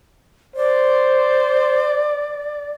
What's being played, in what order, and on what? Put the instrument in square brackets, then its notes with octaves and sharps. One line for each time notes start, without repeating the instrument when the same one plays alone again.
[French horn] C5 [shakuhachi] D5